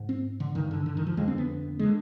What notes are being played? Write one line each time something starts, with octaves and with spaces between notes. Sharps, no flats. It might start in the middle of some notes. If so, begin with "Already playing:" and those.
Already playing: G#2
C4
D3
G2 D3 D#3
D3
D3
D#3
F3
F2 D3 G#3
C4
B3
D3 G#3